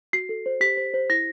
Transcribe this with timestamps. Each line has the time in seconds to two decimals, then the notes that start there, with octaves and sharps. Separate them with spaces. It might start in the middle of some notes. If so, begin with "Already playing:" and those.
0.13 F#4 C7
0.29 A4
0.46 C5
0.61 G4 B6
0.77 C5
0.94 C5
1.10 E4 A#6